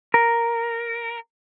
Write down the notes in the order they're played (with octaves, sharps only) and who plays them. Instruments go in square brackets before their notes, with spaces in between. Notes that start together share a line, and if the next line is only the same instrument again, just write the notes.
[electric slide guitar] A#4